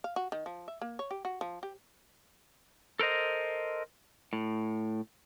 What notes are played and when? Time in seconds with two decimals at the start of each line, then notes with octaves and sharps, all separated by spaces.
0.04 F5
0.16 F#4
0.32 D#3
0.46 F3
0.68 E5
0.81 A#3
0.99 C#5
1.11 G4
1.25 F#4
1.41 F3
1.63 G4
2.99 A4 A#4 C5 D#5
4.33 A2